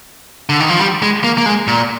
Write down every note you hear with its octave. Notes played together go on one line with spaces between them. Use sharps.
D3
D#3
F3
G3
G#3
A#3
A#3
G#3
A#2